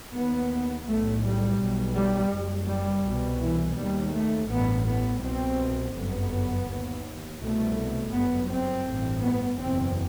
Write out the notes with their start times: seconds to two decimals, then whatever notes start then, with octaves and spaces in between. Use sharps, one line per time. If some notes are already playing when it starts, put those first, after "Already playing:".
0.14 D#2 B3
0.87 B1 A2 A3
1.23 G3
1.60 B1 B2
1.96 G3
2.33 F#1 F#2
2.68 G3
3.05 C2 B2
3.42 E3
3.78 D#2 G3
4.15 A3
4.50 A1 G2 B3
4.86 B3
5.23 C2 B2 C4
5.95 G1 F#2 B3
6.69 D#2
7.40 C2 B2 A3
8.13 G1 F#2 B3
8.50 C4
8.86 A1 G2
9.22 B3
9.59 F#1 E2 B2 C4